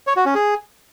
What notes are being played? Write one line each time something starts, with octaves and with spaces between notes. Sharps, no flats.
C#5
F#4
C#4
G#4